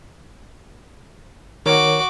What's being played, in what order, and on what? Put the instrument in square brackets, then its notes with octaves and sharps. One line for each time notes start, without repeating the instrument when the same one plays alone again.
[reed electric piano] D#3 A#4 C#5 [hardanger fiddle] F#4 D6